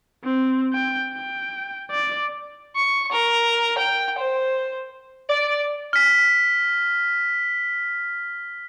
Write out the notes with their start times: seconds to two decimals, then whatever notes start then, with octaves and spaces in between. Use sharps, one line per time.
0.24 C4
0.74 G5
1.13 G5
1.91 D5
2.76 C#6
3.12 A#4
3.78 G5
4.18 C5
5.29 D5
5.93 F6 B6